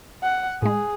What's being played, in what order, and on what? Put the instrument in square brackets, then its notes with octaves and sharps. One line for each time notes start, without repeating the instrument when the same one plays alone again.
[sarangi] F#5
[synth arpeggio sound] A2 G#3 [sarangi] G#4